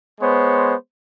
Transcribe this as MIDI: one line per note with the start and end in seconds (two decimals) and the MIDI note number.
0.21 0.74 56
0.21 0.74 59
0.21 0.74 72
0.21 0.74 73